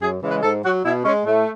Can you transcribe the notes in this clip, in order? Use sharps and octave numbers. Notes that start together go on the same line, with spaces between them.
F#2 G#4
C#3 E3 G#3
B4
G#2 A4
F#3 F#4
B2 E4
G#3 C#4
A2 A3